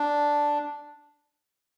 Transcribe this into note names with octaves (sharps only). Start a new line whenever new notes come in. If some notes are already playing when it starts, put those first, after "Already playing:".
Already playing: D4